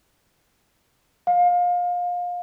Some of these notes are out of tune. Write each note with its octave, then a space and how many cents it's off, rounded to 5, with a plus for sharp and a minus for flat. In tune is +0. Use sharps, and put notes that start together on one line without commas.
F5 +25